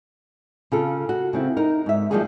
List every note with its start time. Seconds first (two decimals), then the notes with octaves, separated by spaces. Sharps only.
0.72 C#3 F4 A4
1.09 F#4
1.33 C#3 C4 E4
1.57 D#4 A#4
1.86 G#2 E5
2.11 F3 G3 A#3 D#4 F#4 G#4